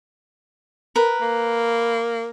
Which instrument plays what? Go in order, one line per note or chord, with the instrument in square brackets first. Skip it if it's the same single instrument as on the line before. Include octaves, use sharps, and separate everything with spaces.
[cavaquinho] A#4 B4
[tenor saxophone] A#3